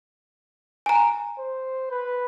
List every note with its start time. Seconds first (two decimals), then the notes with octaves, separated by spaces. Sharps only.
0.86 G#5 A#5
1.39 C5
1.91 B4